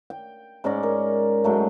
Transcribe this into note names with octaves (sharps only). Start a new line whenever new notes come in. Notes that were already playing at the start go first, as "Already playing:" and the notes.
G5
G#2 C#4 D5 A#5
A#4
G#2 F#3 A3